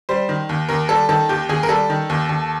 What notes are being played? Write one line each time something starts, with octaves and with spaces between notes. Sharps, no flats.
G3 C5
D#3
D#2
D#2 A#4
G3 A4
D#3 A4
D#2 G4
D#2 G#4
A#4
G3 A4
D#3
D#2
D#2